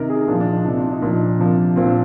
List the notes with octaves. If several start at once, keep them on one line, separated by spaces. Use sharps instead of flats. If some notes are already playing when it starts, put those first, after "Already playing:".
Already playing: C3 D#3 A#4
G#4
A#2 F3 D4
D4
D#4
C3 F3 D#4
D4
D#4
A#2 F3 D4
C3 F3
A#2 F3 C4
D4